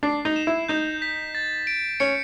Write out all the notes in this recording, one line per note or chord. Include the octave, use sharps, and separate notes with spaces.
D4 C7
D#4
E7
E4
D#4 G6
B6
A6
D7
C#4 C#7